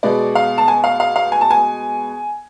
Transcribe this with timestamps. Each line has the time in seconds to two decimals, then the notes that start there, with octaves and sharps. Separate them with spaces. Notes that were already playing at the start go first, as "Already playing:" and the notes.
0.03 B2 G#3 B3 D5
0.35 F5
0.58 A5
0.68 G#5
0.84 F5
1.00 F5
1.16 F5
1.32 G#5
1.41 A5
1.51 G#5